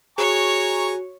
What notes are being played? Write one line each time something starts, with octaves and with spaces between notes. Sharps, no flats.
F#4 G#4 C#5 G#5 A#5 C#6